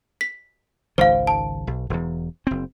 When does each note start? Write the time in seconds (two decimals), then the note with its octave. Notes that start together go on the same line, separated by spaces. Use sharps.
0.21 B6
0.98 G#1 C#2 D#3 C5 F5
1.27 A5
1.67 B1
1.90 E1 E2
2.47 F#1 C4